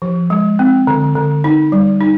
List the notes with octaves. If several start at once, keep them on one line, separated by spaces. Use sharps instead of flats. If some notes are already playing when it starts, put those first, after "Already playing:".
F3
G#3
C4
D3
D3
D#4
G3
D#4